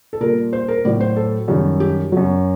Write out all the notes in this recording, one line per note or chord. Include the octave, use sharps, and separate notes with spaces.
A4
A#2 G3 A#4
C5
A#4
A2 F#3 D5
C5
A4
F#2 D#3 G3
G4
F#2 F#3